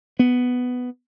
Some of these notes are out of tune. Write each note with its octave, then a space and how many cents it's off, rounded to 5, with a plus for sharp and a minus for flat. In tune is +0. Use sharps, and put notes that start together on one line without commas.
B3 +5